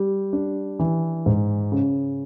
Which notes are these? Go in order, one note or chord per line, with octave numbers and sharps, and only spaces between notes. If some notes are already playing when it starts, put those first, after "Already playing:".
Already playing: G3
D4
E3
G#2
C#3